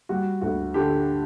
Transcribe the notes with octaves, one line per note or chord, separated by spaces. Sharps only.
G3 F#4
D2 F#4
D3 G4